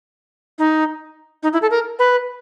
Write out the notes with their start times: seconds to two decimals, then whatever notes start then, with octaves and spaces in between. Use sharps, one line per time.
0.59 D#4
1.43 D#4
1.53 E4
1.62 A4
1.71 A#4
1.99 B4